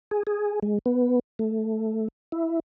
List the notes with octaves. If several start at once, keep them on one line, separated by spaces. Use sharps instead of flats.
G#4
G#4
G#3
B3
A3
E4